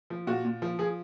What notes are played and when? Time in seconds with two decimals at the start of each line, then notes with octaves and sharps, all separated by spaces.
0.10 F3
0.27 A#2 F#4
0.45 A#2
0.62 F3
0.79 F3 G#4